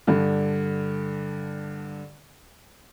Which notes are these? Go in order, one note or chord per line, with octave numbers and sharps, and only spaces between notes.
G2 D3